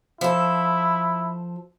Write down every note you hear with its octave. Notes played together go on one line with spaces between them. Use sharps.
F3 E4 A4